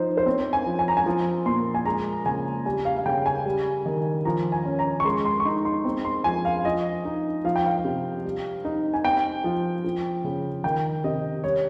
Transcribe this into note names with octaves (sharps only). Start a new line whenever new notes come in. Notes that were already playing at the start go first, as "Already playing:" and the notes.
Already playing: F3 D#4 C5
C5
C4 C#5
G#5
F3
G#5
A#5
G#5
F3
A#2 C6
G#5
G#3 A#5
C#3 G#5
G3 G#5
F5
F5
C#3 G5
G#5
G3
D#3
F3 A#5
G#5
C#4
A#5
C#6
G#3 C6
C6
C#6
D#4 C6
C6
C4
C6
F3 G#5
F5
F3 D#5
D#4
F3 F5
G5
F5
C3
G3
D#4
G#5
C4 G5
F3
F3
C#3
D#3 G5
C3 D#5
G3 C#5